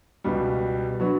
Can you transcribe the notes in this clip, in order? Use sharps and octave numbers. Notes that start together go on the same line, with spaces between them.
C#2 B2 G3
F#3 B3 D4 F#4